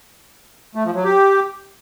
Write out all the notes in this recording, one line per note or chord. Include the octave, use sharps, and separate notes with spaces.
A3
F3
F#3
G4